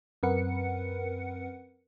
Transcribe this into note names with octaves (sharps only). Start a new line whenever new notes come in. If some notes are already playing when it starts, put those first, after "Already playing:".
F#2 C4 A#4 B4 F#5 C#7